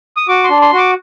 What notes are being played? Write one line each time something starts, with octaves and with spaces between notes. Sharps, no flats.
D#6
F#4 D6
C6
D4
C6
F#4 D6